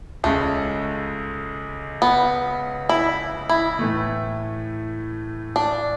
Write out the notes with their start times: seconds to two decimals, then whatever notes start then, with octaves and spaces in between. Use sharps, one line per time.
0.24 C#2 C#3 G#3 A3
2.02 B3
2.89 E4
3.49 E4
3.79 A2 E3 A3
5.56 D4